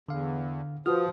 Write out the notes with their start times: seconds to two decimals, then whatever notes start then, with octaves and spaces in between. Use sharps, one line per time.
0.09 E2 D3 F5
0.86 F3 F4 F#4 B4 D#6 F6